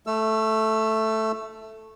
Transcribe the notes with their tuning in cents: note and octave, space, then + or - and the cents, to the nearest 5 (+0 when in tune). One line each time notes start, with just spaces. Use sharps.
A3 +0 E6 +25